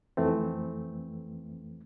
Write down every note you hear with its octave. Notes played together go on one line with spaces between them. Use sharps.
F2 E3 A3 C4